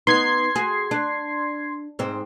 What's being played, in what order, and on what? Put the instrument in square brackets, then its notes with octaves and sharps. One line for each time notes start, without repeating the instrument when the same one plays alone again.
[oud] B3 D#4 [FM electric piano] C6 G#6 C7
[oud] F#4 G#4
D4
G#2 C4